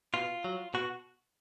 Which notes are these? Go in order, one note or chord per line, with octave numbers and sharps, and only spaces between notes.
B2 F4
F#3
B2 F#4